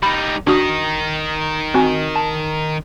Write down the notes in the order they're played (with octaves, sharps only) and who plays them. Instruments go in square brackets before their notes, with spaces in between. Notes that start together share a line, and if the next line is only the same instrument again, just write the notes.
[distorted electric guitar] G3 D#4 [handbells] B5
[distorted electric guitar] D#3 D#4 [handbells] D4 F#4 D#6
[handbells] C4 F#4 G#5
A5